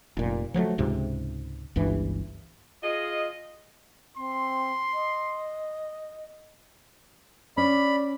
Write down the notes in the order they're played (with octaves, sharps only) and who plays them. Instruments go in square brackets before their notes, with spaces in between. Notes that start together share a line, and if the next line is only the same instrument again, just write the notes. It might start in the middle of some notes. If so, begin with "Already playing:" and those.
[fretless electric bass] F1 A#2
F3 F#3 G#3 A3
C#2 G#2 C3
G1 C#2 G2 E3
[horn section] F4 G#4 D#5
[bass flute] C4 [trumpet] C6
[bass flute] D#5
[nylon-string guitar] C#4 [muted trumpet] D5 [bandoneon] B5